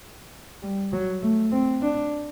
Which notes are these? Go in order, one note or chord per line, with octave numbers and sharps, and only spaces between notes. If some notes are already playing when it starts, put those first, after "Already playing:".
G3
F#3
A3
C4
D4